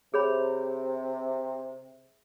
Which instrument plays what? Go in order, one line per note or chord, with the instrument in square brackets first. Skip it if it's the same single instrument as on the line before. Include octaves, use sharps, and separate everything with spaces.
[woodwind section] C3 [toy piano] G#4 C#5 B5